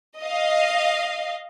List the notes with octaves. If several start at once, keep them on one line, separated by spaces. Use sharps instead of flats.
D#5 F5